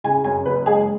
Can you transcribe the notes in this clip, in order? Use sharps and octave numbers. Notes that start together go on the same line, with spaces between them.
C#3 G#5
F#2 G#5
F#1 B4
G#3 G#4